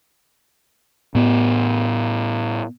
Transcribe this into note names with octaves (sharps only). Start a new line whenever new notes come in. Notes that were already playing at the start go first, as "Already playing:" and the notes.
A2 B3